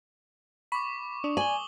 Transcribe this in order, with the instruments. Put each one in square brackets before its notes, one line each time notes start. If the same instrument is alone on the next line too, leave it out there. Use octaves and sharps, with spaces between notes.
[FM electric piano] B5 [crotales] C#6 D6
[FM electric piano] D4 [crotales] D#6
[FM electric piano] D5 [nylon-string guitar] G#5 [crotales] F#7 G7